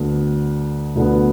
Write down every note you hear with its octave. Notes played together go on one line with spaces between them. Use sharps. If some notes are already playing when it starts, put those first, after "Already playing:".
Already playing: D2 D3 B3
D2 D3 B3